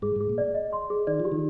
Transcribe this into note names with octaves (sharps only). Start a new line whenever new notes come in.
G#2 G#4
G#2 G#4
A#2
D5
D#5
C6
G#4
D#3 D5
F3
G4
D#3